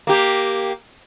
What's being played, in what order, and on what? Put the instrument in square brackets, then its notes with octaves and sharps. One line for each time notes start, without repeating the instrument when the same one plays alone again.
[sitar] A#3 G4